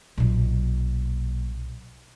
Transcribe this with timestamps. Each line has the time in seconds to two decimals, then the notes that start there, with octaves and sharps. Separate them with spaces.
0.18 B1 A#2